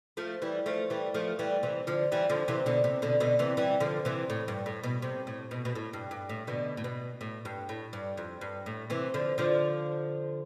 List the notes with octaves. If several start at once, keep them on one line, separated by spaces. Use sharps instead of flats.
F3 A3
E3 G3
F3 A3
E3 G3
F3 A3
E3 G3
C3 E3
D3 F3
E3 G3
D3 F3
C3 E3
B2 D3
C3
B2 D3
B2 D3
C3 E3
E3 G3
D3 F3
C3 E3
A2
G2
A2
B2
C3
A2
B2
B2
A2
G2
G2
A2
B2 D3
A2
B2
A2
G2
A2
G2
F2
G2
A2
C3 E3
D3 F3
D3 F3